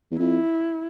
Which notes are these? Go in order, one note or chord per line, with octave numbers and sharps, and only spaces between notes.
E2
F2 E4